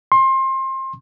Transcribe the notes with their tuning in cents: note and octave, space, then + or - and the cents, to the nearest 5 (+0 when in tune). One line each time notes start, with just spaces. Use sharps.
C6 +25